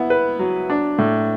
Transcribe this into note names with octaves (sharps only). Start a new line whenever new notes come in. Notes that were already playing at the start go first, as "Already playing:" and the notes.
Already playing: B3 E4
B4
F#3
D4
A2